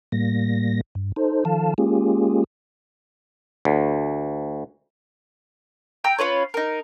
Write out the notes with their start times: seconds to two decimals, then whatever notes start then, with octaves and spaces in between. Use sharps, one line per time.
0.12 A2 G3 A#3 A#6
0.95 G2
1.16 D#4 A4 C5
1.45 D#3 F3 A4 F5 A5
1.78 G#3 A#3 C#4 F4 G4 G#4
3.65 D2
6.04 G5 A#5 E6
6.19 C#4 F4 B4 C#5
6.54 D#4 A#4